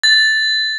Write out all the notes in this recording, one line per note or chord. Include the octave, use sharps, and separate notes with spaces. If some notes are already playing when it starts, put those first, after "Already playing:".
A6